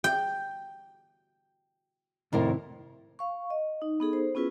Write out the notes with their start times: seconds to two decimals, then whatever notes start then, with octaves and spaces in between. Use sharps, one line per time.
0.04 G5
2.33 F2 A2 C3 D#3 E4 A#4
3.19 F5 C#6
3.50 D#5
3.82 D#4
4.00 B3 D#4 G#4 A4
4.13 C5
4.35 B3 C#4 E4 F4 G#4 B4